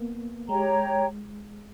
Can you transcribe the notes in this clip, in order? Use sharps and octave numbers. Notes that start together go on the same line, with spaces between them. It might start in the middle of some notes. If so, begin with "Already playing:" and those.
Already playing: A#3 B3
G#3 G4 C#5 G5 A#5